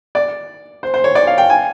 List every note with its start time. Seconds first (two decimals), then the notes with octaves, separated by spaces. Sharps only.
0.15 D5
0.83 C5
0.94 C5
1.04 C#5
1.15 D5
1.27 F5
1.38 G5
1.50 G#5